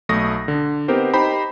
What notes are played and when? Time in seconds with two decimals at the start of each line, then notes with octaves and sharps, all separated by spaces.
0.09 B1 A3 C#6 D#6 A#6
0.48 D3
0.88 B3 C4 D#4 G4 A#4 C5
1.14 D#4 G4 C5 G5 A#5 B5